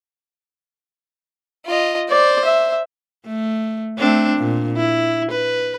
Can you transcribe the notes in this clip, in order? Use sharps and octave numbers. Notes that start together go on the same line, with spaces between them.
F4 D#5
C5 D5
E5
A3
A3 C4 D4
A#2
E4
B4